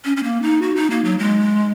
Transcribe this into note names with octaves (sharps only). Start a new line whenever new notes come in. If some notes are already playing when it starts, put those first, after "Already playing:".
C#4
C#4
A#3
D#4
F#4
D#4
A#3
F#3
G#3